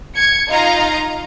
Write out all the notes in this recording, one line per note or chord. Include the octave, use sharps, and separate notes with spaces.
G#6 C#7
D#4 F4 D#5 F5 A#5